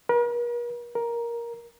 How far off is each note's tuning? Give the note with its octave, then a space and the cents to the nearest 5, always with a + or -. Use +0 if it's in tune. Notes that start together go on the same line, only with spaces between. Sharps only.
A#4 +45
A#4 +10